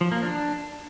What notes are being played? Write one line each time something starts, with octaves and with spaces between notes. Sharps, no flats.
F3
A#3
D4